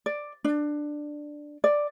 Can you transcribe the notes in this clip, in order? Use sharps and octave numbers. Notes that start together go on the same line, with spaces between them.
D5
D4
D5